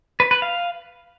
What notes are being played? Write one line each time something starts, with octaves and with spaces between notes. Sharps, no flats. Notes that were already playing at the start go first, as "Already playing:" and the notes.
B4
B4
F5